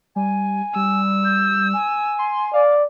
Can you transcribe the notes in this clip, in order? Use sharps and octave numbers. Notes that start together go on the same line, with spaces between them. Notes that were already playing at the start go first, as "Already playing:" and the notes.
G3 G#5
G3 E6
G6
G#5
C6
D5 F5